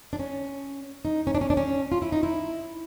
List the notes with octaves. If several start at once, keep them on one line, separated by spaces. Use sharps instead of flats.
D4
C#4
D#4
C#4
D4
C#4
D4
C#4
F4
E4
D#4
E4